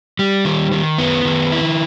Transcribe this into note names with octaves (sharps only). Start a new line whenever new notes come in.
G3
D#3
D#3
B3
D#3
E4